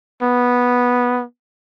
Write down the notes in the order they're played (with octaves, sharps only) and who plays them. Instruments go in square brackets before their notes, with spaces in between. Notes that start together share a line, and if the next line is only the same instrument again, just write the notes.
[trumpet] B3